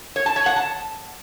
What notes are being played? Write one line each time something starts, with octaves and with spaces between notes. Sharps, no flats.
C#5
A5
C#5
F#5
A5